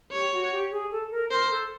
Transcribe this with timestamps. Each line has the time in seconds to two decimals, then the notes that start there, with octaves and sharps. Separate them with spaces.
0.11 G4 C#5
0.32 F#4
0.51 G4
0.71 G#4
0.91 A4
1.11 A#4
1.31 A#4 C5
1.51 A4